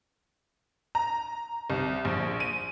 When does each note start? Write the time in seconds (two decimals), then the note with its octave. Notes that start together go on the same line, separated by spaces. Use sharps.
0.95 A#5
1.70 C2
2.05 A#1
2.40 D#7